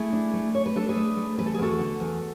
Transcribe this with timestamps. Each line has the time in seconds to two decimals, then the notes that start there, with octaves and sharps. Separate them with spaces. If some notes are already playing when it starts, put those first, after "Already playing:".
Already playing: A3 E4 G#4
0.13 D4
0.34 A3
0.54 A3 C#5
0.66 B4
0.76 D4 A4
0.89 G#4 B4
0.96 A3
1.17 A3
1.38 E2 B4
1.46 A4
1.54 G#4
1.58 E2 F#4 A4
1.79 D3
2.00 E2